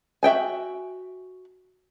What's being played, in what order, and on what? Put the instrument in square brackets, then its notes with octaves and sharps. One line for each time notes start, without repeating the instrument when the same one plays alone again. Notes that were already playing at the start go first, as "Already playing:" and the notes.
[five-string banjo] F#4 E5 G5 G#5